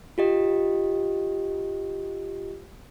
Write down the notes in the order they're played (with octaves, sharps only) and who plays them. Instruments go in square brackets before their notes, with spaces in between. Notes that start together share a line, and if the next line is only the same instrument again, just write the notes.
[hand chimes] F4 G4 D#5